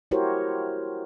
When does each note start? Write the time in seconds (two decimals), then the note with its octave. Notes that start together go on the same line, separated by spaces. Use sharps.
0.11 E4 F#4 G4 A#4 C5 C#5